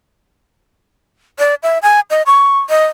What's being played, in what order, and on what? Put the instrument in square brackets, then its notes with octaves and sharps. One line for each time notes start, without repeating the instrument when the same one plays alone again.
[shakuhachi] D5
E5
G#5
D#5
C#6
D#5